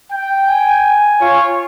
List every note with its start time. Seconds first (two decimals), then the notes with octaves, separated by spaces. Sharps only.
0.12 G5
0.49 G#5
1.21 F4 C#5